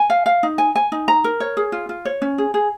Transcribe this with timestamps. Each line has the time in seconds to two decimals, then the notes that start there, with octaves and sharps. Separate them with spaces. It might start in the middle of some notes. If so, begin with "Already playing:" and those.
Already playing: G#5
0.10 F5
0.26 F5
0.43 D#4
0.58 G#5
0.75 G#5
0.92 D#4
1.08 A#5
1.24 A#4
1.40 C#5
1.57 G#4
1.72 F4
1.89 F4
2.05 C#5
2.22 C#4
2.38 G#4
2.54 G#4